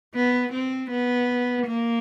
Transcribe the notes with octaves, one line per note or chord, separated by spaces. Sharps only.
B3
C4
B3
A#3